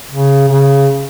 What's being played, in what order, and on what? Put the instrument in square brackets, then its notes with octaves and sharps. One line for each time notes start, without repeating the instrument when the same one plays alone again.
[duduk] C#3
C#3